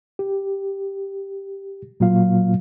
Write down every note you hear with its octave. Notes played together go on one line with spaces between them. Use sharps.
G4
A#2 F#3 A#3 F4 F5